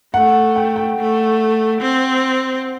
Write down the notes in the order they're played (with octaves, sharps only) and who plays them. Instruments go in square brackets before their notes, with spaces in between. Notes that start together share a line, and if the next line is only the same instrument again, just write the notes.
[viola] A3 [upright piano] F#5
[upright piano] G5
G5
[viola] A3
C4